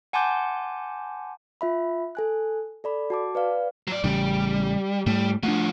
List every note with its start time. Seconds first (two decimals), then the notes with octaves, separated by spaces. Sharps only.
0.13 F#5 G#5 A5 C6 D6 G6
1.61 F4 E5 B5
2.15 A4 G#5 F#6
2.84 A4 D5 B5
3.10 F#4 A5 D6
3.35 B4 D5 F5
3.87 F#3 D5
4.04 A1 C#3 G3
5.06 G#2 G3 A3
5.43 F3 A3 D4 F#4